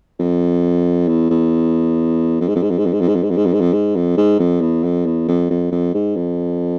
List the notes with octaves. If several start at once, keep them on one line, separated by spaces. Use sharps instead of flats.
F2
E2
E2
F2
G#2
F2
G#2
F2
G#2
F2
G#2
F2
G#2
F2
G#2
F2
G#2
F2
G#2
F2
G#2
F2
G#2
F2
E2
F2
E2
F2
F2
F2
G#2
F2